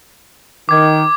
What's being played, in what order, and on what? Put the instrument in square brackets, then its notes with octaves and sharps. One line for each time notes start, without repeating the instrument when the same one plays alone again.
[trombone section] D#3 [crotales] D6 G#6